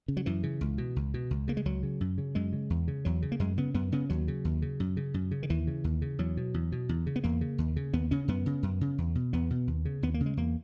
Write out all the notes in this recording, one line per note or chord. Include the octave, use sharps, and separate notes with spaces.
C#3
F#3
F#2 E3
C#3
C#2
B2
C#2
B2
C#2
C#3 A#3
G#3
C#2 F#3
C#3
F#2
C#3
F#2 G#3
C#3
E2
C#3
E2 F#3
C#3
A#3
F#2 G#3
C#3 B3
F#2 B3
C#3 B3
D#2 F#3
C#3
D#2
C#3
F#2
C#3
F#2
C#3
D#3
D#2 E3
C#3
D#2
C#3
E2 F#3
B2
E2
B2
E2
C#3
B3
E2 A#3
C#3
D#2
C#3
D#2 B3
C#3 C#4
F#2 B3
C#3
F#2
C#3
E2
B2
E2 B3
B2
D#2
C#3
D#2 B3
A#3
C#3
G#3
E2 A#3